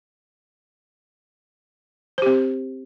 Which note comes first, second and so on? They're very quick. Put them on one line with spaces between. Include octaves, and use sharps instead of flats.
C5 G4 C4